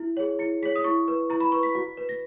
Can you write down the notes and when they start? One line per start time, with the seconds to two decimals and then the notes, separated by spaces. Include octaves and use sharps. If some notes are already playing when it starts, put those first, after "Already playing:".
Already playing: E4
0.17 G#4 C#5
0.39 E4 C#7
0.63 G#4 C#5 B6
0.76 D#6
0.84 E4 C#6
1.08 B4
1.30 E4 A#5
1.40 B5
1.52 B4 C#6
1.63 B6
1.75 F#4
1.97 B4
2.09 A#6